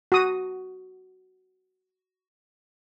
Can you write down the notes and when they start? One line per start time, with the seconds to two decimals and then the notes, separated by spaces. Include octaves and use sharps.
0.12 F#4 D#6